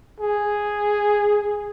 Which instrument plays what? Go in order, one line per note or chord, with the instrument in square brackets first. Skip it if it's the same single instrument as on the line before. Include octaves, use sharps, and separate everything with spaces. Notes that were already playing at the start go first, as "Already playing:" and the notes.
[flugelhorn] G#4